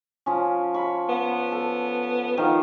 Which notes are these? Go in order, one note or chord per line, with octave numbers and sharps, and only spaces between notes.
F3 C#4
C#5 B5
B3
A4
D#3 F3